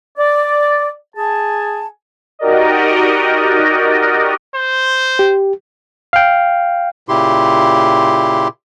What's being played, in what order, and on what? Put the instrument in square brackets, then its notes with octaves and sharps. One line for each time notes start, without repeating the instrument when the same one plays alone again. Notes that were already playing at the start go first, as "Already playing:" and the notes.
[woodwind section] D5
G#4 G#5 A5
[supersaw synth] D#4 F#4 G4 A#4 D5 D#5
[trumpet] C5
[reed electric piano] G4
[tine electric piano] F5 G5
[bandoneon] A#2 C#3 E4 G4 C6